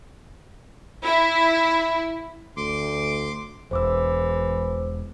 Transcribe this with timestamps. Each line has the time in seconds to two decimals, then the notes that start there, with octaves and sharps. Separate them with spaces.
1.03 E4
2.57 D2 C6 D6
3.71 E1 E3 C5 D6 E6